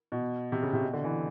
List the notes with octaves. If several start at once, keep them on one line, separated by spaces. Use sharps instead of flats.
B2
C3
C#3
C3
B2
D3
E3